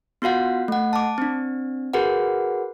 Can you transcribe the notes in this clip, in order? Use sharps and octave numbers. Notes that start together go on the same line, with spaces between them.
B3 F4 F#4 F5 F#5
A3 F#5
A5 D6
C4 D4
F#4 G#4 A#4 B4 F#5